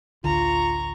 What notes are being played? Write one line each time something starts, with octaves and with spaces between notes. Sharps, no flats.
A1 D2 D3 F4 A#5 C#6